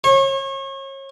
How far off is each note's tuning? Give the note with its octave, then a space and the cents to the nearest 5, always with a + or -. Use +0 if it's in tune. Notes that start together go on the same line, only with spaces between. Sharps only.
C#5 -35